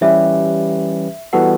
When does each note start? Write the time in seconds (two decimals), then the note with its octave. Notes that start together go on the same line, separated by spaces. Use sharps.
0.01 E3 G3 C#4 G4 B4 E5
1.33 E3 G3 B3 F#4 A4 F#5